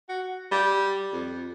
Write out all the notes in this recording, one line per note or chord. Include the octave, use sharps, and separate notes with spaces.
F#4
G3
F2